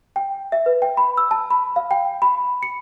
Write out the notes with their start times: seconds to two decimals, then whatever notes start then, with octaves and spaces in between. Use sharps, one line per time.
0.16 G5
0.52 E5
0.66 B4
0.82 G5
0.97 B5
1.17 E6
1.31 A5
1.51 B5
1.76 F5
1.91 G5
2.22 B5
2.63 C#7